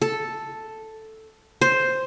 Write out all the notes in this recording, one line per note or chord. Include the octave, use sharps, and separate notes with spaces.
A4
C5